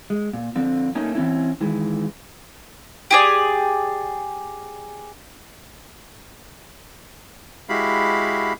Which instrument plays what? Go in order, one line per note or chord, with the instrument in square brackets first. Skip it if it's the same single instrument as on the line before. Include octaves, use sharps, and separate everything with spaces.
[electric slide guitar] G#3
A#2
D3 F3 C4
A3 A#3 C#4 D#4
E3 C4 C#4 E4
D#3 E3 G#3
[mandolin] G4 G#4 D5
[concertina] G#3 E4 F#4 G4 F5 B5